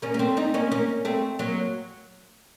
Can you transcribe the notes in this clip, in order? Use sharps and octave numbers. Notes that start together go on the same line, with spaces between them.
A#3 C#4
A#3
A3 C4
C4 D#4
A#3 C#4
A#3 C#4
A3 C4
F#3 A#3